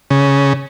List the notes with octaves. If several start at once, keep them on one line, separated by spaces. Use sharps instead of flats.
C#3